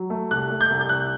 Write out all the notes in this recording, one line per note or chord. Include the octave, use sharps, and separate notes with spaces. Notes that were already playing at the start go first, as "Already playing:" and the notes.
Already playing: F#3
A3
C2 F#6
A3
G6
C2
G6
C2 F#6